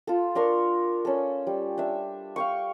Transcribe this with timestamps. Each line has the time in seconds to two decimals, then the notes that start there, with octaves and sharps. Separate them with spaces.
0.07 F4 A4
0.35 D4 A#4 C6 C#6
1.05 C#4 A4
1.47 G3
1.78 D4 E5
2.36 F5 G5 C#6